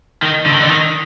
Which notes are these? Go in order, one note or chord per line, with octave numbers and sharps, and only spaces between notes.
D#3
D3
D#3
D3
D#3